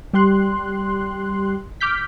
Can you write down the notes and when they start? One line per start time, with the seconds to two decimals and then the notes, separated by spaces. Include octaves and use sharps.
0.13 G3 G4 C6 F#6
1.81 D6 F6 G6 B6